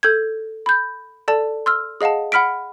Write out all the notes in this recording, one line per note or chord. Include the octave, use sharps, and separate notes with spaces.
A4 G6 G#6
B5 G6
A4 D5 A5
C6 E6 F6
G#4 D#5 F5 F#5 A5
F#5 B5 F6 B6 D7